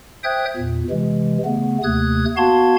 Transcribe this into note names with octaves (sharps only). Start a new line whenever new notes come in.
C5 E5 G5 D#6 F#6 G#6
E2 A#2
C3 E3 G#3
C#3 A3 B3
D#2 C3 A3 D#6 F#6 G#6
B3 F#4 F5 A5 C6 G#6